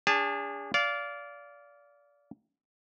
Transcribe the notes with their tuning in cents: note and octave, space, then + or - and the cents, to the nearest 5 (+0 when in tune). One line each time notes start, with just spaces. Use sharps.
D4 -40 G#4 -30 A5 +0
D5 -25 F5 +0